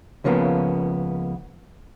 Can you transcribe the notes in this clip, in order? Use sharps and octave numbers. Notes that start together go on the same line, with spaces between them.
C#2 C#3 F3 A#3 B3